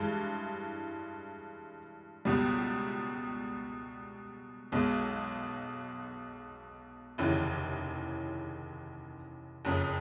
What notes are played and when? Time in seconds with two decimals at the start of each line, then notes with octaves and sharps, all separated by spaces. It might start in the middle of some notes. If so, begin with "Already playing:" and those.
Already playing: G2 E3 G#3
2.25 C#2 B2 G3
4.72 B1 B2 G#3
7.18 F1 D#2 C#3 E3
9.65 F#1 F2 C#3